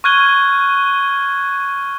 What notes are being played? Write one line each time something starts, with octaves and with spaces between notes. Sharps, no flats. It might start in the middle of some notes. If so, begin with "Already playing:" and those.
C#6 F6 F#6 G#6 D#7 G7